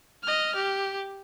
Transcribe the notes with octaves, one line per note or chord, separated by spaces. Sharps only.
D#5 F6
G4